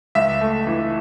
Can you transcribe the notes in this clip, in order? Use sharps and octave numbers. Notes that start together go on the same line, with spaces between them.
C#2 E5
A3
E3